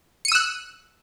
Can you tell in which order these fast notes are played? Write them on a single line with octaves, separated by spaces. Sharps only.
C#7 D#7 E6 F#6